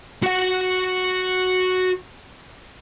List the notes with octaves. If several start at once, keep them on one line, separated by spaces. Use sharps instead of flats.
F#4 F#5